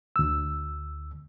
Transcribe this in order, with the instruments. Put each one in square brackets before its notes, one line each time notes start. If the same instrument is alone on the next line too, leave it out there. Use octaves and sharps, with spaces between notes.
[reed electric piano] D2 E6